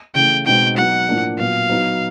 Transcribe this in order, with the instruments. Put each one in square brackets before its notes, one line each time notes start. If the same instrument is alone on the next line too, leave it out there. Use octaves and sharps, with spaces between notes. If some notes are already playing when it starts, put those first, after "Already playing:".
[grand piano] C#3 E3 A3 [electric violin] G5
[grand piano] B2 G#3 C4 D#4 [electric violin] G5
[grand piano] F#3 B3 D#4 [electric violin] F#5
[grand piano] A2 F3 A#3 D4
[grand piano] A#2 F#3 B3 [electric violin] F5
[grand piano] F#3 B3 D#4